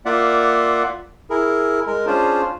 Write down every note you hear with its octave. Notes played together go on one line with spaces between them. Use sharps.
A#3 F4 D5 E5 F#5
E4 G#4 A#4
G#3 A#4
C#4 D4 F4 G#4 C5